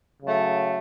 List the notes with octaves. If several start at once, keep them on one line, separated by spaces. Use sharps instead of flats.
C#3 F#3 A3